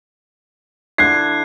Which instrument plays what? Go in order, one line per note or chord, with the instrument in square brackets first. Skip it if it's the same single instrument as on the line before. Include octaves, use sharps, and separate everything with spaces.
[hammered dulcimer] D3 E4 [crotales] F#6 G#6 [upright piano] C7